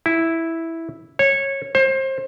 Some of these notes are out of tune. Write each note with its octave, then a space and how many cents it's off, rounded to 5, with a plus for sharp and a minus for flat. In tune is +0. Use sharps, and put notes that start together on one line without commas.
E4 -5
C#5 -15
C5 +30